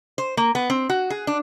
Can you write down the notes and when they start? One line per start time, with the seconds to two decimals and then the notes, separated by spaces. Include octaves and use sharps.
0.18 C5
0.37 A#3
0.55 B3
0.70 C4
0.90 F#4
1.10 G#4
1.27 D4